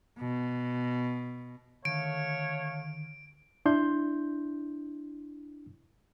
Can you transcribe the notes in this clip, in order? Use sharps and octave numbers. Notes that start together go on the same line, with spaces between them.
B2
D3 D#3 A3 C#5 F5 D7
D4 E4 C6 G6